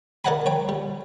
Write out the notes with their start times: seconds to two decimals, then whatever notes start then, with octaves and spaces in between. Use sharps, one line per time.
0.25 A#4 D5 D#5 F#5 G#5 B5
0.46 C#5 G5
0.69 G3